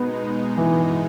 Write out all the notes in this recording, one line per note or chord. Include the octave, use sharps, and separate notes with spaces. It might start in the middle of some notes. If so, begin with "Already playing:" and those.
Already playing: B2 G#3 B3 D#4
E3